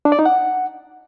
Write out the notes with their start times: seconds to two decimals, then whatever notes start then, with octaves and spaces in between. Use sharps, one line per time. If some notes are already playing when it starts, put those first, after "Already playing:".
0.05 D4
0.12 D5
0.19 D#4
0.25 F#5